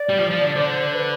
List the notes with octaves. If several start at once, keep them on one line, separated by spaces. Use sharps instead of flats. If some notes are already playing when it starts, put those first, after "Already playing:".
Already playing: D5
G3
F3
F3
D3
D3 C5
B4